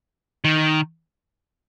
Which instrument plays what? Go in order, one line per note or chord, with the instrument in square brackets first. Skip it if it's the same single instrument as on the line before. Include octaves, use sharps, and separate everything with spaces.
[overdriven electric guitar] D#3